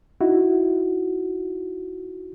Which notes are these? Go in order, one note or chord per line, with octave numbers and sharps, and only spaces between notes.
D#4 E4 F#4